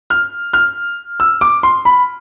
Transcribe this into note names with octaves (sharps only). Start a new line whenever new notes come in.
F6
F6
E6
D6
C6
B5